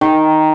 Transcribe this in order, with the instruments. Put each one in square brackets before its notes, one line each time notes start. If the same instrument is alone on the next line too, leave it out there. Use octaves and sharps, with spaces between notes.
[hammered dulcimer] D#3